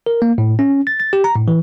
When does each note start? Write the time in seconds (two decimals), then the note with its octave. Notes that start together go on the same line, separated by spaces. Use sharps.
0.06 A#4
0.22 A#3
0.38 A2
0.59 C#4
0.87 A6
1.00 A6
1.13 G4
1.24 A#5
1.36 A2
1.48 E3